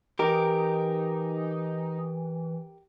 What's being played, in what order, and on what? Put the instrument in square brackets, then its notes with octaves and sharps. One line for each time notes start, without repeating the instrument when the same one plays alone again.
[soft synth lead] E3 [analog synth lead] D#4 [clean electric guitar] G4 A#4